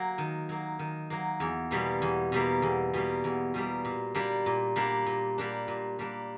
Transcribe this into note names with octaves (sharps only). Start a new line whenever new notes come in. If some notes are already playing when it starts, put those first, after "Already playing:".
Already playing: F#3 A#3
D#3
F#3 A#3
D#3
F#3 A#3
E2
B2 G3 A#3
E2
B2 G3 A#3
E2
B2 G3 A#3
E2
B2 G3 A#3
A#2
G3 A#3 D4
A#2
G3 A#3 D4
A#2
G3 A#3 D4
A#2
G3 A#3 D4